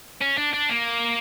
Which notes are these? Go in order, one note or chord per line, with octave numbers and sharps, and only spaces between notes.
C#4
D4
D4
A#3